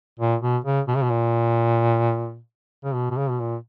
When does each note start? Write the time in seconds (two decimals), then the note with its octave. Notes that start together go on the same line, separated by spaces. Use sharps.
0.20 A#2
0.42 B2
0.65 C#3
0.88 B2
0.96 C#3
1.03 B2
1.10 A#2
2.84 C#3
2.95 B2
3.10 B2
3.17 C#3
3.30 B2
3.40 A#2